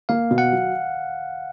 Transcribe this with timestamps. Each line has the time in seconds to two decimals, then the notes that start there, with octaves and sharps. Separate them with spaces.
0.09 A#3 F5
0.31 B2
0.38 F#5
0.52 F#3